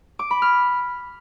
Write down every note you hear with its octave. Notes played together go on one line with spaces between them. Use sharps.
D6
B5
F6